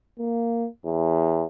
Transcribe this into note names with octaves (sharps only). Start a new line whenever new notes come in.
A#3
E2